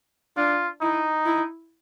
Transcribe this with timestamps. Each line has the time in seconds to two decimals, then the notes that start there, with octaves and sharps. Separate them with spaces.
0.36 D4 F4
0.81 D#4 E4
1.25 E4